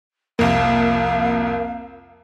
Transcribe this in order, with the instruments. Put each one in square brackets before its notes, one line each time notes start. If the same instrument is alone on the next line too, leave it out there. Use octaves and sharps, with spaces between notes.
[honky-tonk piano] C2 F2 [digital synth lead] A#3 [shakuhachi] F5